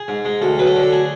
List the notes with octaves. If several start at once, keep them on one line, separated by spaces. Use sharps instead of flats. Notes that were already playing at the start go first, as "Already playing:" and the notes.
Already playing: G#4
G#2
G#3
D2 A4
F#3 B4
A4
D3
A4
G#4